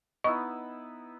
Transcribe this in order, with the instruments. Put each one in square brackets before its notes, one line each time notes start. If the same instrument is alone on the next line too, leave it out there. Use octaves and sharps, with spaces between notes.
[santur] B3 D#4 E4 [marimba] D#5 C#6